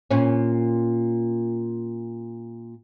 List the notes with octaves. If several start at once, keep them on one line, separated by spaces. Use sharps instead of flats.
A#2 C#4